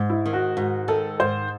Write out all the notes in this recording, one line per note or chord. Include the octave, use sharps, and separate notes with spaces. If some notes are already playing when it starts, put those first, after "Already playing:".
Already playing: G#2
E4
D#3
F#4
G#2 F#4
D#3 A4
G#2 C5